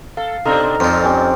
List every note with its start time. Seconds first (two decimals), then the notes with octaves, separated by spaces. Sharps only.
0.17 A4 F5
0.45 B2 C4 D4 D#4 A4 A#5 F6
0.80 F2 A#2 F3 C4 G5
1.03 C4 C#4 G4